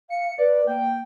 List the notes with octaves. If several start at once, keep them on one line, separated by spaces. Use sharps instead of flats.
F5 C#7
B4 D5
A#3 G5